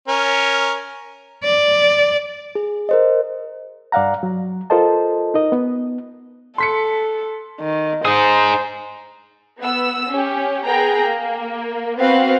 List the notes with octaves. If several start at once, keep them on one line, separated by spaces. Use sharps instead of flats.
C#4 A#4
D5
G#4
A#4 C5 D#5
G2 D5 F5 F#5 A#5
F#3
F4 A4 A#4 C5 D#5 A5
D#4 A#4 D#5
B3
A4 C6 B6 C#7
D#3
D#4 G#4 C5 D#6
B3 E6
C#4 G4
B3 G#4 A#4 G5 A#5
A#3
B3 C4 F#4 B4 C5 F5